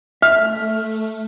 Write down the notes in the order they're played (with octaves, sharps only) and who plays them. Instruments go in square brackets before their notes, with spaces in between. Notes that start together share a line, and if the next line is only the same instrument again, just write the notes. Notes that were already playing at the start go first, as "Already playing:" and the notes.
[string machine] A3 [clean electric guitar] E5 [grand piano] F6